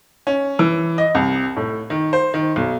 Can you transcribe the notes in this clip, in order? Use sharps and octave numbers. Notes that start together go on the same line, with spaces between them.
C#4
E3
D#5
C2
A2
D#3
C5
D#3
B1